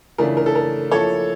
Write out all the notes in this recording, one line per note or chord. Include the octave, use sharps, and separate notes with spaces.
C#3 E3 A3 D4 F4 A#4
A#4
A4
A#4
F3 A#3 E4 A4 C#5